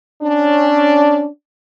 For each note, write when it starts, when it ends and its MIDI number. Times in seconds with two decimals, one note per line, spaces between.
0.22 1.28 61
0.22 1.28 62